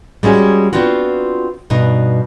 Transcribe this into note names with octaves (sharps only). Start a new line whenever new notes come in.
G3 G#3 C#4 F#4 G#4
B3 C4 D4 F4 F#4
G2 B2 D#4